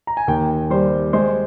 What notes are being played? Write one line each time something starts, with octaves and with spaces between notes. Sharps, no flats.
A#5
G#5
D#2 G5
G3 C5
G#3 C5